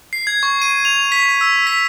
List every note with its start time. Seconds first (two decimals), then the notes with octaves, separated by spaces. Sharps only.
0.13 C7
0.27 G#6
0.43 C#6
0.62 D#7
0.85 F7
1.12 B6
1.41 E6
1.67 B6